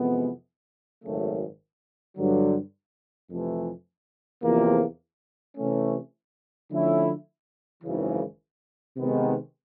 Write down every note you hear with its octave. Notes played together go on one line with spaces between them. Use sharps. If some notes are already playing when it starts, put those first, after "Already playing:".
Already playing: F2 C3 E3 G#3 B3
G#1 F#2 C#3 F#3 A3
G2 D3 F#3
F2 C3 E3 A3
E2 C3 F3 A#3
C3 E3 A3 C#4
D3 F3 A3 C#4 E4
G#1 F#2 C#3 E3
C3 D#3 G#3 B3